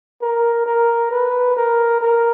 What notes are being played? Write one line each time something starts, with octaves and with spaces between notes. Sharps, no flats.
A#4
A#4
B4
A#4
A#4